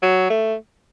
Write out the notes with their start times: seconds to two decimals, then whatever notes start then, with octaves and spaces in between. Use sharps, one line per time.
0.02 F#3
0.30 A3